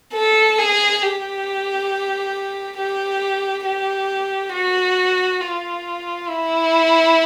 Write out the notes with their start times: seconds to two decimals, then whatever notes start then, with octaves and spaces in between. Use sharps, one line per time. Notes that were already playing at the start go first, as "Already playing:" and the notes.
0.14 A4
0.58 G#4
1.03 G4
2.77 G4
3.65 G4
4.53 F#4
5.41 F4
6.29 E4